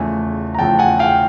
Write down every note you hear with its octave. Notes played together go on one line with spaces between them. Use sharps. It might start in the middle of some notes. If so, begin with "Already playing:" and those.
Already playing: E2 C#3 F3 A3 G#5
A#5
E2 C#3 F3 A3 G5 A5
F#5 G#5
F5 G5